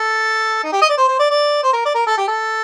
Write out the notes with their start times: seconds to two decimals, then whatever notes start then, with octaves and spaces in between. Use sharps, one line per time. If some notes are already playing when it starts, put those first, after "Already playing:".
Already playing: A4
0.64 D#4
0.72 G4
0.82 D#5
0.89 D5
0.98 C5
1.08 C5
1.19 D5
1.31 D5
1.63 C5
1.73 A#4
1.85 D5
1.95 A#4
2.07 A4
2.18 G4
2.28 A4